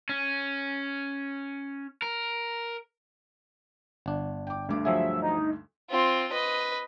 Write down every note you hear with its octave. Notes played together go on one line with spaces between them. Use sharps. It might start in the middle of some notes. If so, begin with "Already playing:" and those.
C#4
A#4
G1 D4
G5 D6
D2 G2 D6
F3 F#3 G#4 E5
D#4
C4 F4
B4 D#5